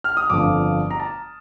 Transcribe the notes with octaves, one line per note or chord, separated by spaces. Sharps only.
F6
D#6
G1 F2 D3 F3 D6
A#5
A5